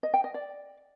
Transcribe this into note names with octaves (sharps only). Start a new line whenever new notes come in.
D#5
G5
D#5
D5